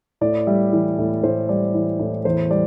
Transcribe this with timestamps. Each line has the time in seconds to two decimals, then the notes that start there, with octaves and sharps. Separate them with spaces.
0.21 A2 D5
0.47 G3 E5
0.73 E3
0.98 A2
1.23 A2 C5
1.49 G3 D5
1.74 E3
1.99 A2
2.25 E2 C5
2.50 G3 D5